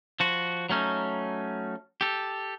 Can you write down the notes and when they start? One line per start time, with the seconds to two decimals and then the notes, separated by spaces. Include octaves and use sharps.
0.20 F3 F#4
0.70 F#3 A3 C#4 D#4
2.01 G4 A4